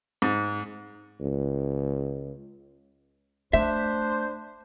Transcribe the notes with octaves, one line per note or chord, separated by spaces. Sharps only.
G#2
C#2
A3 D4 C5 E5